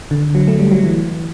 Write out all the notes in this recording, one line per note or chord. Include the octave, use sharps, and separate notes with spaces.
D3
F#3
A3
G3
F#3
E3